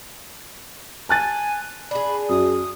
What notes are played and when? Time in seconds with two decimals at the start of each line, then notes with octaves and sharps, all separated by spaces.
1.09 G#5 A5 F#6 A6
1.91 D4 G#4 B5
2.29 F#2 D#6